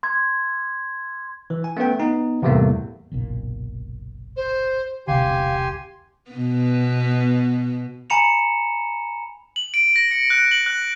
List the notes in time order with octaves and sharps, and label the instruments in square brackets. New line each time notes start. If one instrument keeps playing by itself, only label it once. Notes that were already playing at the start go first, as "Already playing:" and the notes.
[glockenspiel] C6 G#6
[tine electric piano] E3
G#5
A3 B3 C#4 B4 G5
B3 D#4
E2 A2 C3 G3 A3 A#3
[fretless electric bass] F#1 B1 A#2
[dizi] C5
[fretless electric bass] E1 C2 D3 [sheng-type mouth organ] G4 G#5 C6 [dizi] F5
[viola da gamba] B2 B3
[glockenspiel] G#5 A#5 B5 C#7 E7 F7
[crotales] F#7
D7
A#6
C#7
F#6
F#7
F#6